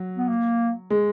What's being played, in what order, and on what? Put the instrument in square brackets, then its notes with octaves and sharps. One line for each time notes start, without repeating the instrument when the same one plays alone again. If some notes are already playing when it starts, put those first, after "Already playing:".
Already playing: [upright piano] F#3
[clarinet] B3
A#3
[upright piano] G#3